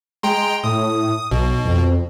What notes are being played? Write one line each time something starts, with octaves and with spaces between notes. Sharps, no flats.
G#3 G5 A#5 C6
A2 D#6
B1 B2
F2